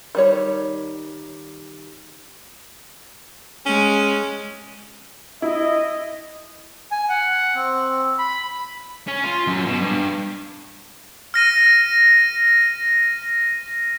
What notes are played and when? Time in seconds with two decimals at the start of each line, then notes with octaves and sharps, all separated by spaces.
0.15 D#3 G3 C#5
3.66 G#3 C#4
5.42 E4 D#5
6.91 G#5
7.09 F#5
7.55 C4
8.18 B5
9.08 C#4
9.24 F4
9.47 F#2
9.67 B2
9.81 G2
11.34 F6 A#6 D#7